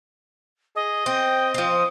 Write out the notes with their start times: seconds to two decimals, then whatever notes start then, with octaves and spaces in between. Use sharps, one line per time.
0.76 G#4 D#5
1.06 C4 G5
1.54 F3 C4 D#6